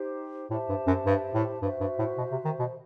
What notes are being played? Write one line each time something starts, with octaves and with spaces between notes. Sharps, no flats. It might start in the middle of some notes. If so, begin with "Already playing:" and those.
Already playing: D#4 G4 C5
A2 G4 C5 E5 A5
G2
F#2
G2
A2
G2 F#4 C5 E5
G2
A2
B2
C3
D#3
B2